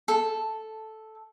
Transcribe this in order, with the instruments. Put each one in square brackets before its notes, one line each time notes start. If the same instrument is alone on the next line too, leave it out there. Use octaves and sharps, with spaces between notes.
[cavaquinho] A4